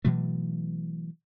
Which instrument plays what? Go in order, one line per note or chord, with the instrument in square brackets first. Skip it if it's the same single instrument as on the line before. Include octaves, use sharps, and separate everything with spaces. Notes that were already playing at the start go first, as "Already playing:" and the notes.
[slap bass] B2 E3 F#3 A3